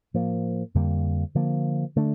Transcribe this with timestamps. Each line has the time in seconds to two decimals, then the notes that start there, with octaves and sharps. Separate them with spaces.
0.14 A2 F3 A#3
0.74 F2 D3 G3 A#3
1.35 D3 F3 A#3
1.96 D3 A3 D4